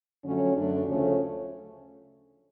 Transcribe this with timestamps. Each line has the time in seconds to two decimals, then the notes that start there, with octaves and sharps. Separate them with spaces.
0.25 F2 D3 F#3 A3 C#4
0.55 F#2 D3 F#3 A3 D4
0.86 D2 C#3 F3 A3 C#4